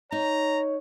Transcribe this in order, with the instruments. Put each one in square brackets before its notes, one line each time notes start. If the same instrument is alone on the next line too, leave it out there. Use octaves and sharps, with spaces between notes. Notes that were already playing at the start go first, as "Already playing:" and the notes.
[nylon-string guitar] D#4 [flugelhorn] C#5 [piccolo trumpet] A#5